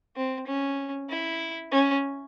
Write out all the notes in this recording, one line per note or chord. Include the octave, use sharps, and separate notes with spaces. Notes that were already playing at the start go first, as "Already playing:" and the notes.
C4
C#4
E4
C#4